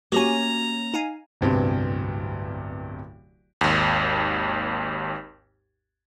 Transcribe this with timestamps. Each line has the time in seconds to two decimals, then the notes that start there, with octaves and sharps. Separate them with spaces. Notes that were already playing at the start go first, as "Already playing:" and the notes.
0.12 A#3 C#4 F#4 G4 G#5 A#5
0.94 D#4 F5 G#5
1.41 D1 C2 G2 B3 C4
3.61 G#1 D#2